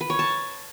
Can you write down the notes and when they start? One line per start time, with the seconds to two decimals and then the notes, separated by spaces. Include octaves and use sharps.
0.01 B4
0.10 C#5
0.19 A5